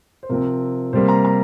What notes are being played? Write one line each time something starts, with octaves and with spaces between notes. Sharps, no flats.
C5
C3 F3 C4 A#4
C3 G3 A#3 C5
A#5
A#5